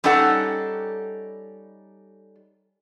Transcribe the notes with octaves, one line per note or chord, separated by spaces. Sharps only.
G3 C#4 D#4 G4 A4 F#5